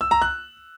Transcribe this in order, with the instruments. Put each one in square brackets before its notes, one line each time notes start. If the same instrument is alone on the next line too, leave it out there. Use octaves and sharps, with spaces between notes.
[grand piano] E6
A#5
F#6